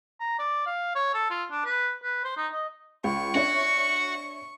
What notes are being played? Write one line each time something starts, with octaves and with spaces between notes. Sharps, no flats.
A#5
D5
F5
C#5
A4
F4
D4
B4
B4
C5
D#4
D#5
C#2 C#6
D4 F#4 C#5 E5